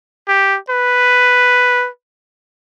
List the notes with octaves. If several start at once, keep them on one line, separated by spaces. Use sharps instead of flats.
G4
B4